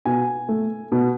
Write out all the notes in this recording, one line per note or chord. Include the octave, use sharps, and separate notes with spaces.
B2 G#5
A3
B2